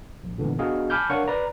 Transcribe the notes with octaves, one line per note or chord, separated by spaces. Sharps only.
A#1
A#2 D3 E3 G#3 B3
B3 D4 F#4 G#4 D#5 F5
G#5 A5 B5 D6 F6 G6
D4 A#4 C#5 F5 F#5 C#6
B4 D5 A#5